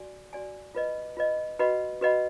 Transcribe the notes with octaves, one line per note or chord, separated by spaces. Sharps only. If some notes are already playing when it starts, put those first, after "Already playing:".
Already playing: F#4 D5 G#5
F#4 D5 G#5
F4 B4 D#5
F4 B4 D#5
F#4 B4 D#5 F#5 B5
F#4 B4 D#5 F#5 B5